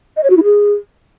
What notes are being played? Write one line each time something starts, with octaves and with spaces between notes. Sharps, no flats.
D#5
C#5
F#4
E4
G#4